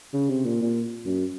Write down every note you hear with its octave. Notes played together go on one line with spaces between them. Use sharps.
C#3
C3
A#2
A#2
F#2